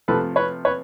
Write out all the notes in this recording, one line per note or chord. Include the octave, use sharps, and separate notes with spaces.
C3 F3 A3 A4 B4
B4 C#5
B4 C#5